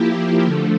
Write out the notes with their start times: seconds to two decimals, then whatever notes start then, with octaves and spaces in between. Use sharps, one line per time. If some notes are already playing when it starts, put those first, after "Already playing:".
Already playing: F3 A#3 E4 G4
0.45 D3 F3 A3